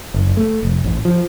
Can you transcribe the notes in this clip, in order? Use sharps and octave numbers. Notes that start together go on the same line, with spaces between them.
F#1
A3
F1
A1
F3